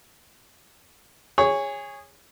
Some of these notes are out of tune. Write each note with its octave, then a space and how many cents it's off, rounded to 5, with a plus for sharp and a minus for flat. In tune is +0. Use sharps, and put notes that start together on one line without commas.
G#4 -20 C#5 +0